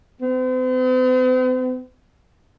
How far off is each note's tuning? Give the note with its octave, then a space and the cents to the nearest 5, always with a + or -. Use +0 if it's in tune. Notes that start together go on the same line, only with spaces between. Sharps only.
C4 -45